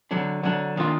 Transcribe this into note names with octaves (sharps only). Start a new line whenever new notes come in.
D3 F#3 D4
D3 F#3 D4
D#3 A#3 D4 F4